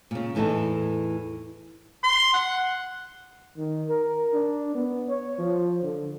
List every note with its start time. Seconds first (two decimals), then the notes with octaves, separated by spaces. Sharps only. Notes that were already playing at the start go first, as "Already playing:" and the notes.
0.11 A#2 C#3
0.35 E2 A2 E3 D#4 A4
2.04 C6
2.34 F#5
3.58 D#3
3.89 A#4
4.34 D4
4.75 B3
5.09 C#5
5.39 F3
5.83 D3